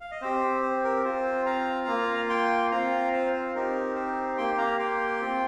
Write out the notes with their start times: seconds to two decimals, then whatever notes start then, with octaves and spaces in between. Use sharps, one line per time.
0.01 F5
0.11 D#5
0.21 C4 G4 C5
0.62 C5
0.84 A#4
1.04 C4 F4 C5
1.46 F5 A#5
1.88 A#3 F4
2.29 G5 C6
2.71 C4 F4 F5 A#5
3.13 C5 F5
3.33 C5
3.55 C4 D#4 G4 A#4
3.96 C5
4.38 A#3 G4 G5 C6
4.58 F5 A#5
4.79 G5 C6
5.21 C4 F4